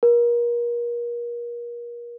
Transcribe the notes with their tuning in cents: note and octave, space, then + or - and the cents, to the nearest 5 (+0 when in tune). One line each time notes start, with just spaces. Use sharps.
A#4 +35